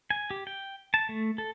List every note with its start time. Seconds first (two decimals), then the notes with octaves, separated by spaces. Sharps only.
0.10 G#5
0.31 G4
0.47 G5
0.94 A5
1.09 A3
1.38 A4